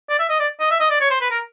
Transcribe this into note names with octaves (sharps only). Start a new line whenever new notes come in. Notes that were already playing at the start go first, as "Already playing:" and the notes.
D5
E5
D#5
D5
D#5
E5
D#5
D5
C#5
C5
B4
A#4